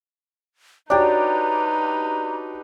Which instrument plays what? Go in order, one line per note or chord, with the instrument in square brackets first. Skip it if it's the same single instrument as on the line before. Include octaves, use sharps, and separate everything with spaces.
[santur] D4 G4 [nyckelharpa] D#4 B4 [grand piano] F#4 C#5 D5 [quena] A#5